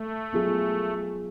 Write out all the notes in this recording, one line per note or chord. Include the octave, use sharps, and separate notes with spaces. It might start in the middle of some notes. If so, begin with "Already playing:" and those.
Already playing: A3
F#3 B3 F4 G#4